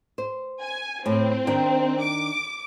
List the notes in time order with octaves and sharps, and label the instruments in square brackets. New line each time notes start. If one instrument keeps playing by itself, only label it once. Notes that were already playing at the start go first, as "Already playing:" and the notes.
[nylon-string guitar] C5
[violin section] G#5
[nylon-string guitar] A2 [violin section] C4
[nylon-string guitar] D#3 D4 G5
[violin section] D6